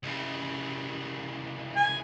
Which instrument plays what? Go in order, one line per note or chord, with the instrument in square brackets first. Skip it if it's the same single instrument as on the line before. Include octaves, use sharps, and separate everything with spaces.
[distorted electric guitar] C2 C#3
[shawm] G#5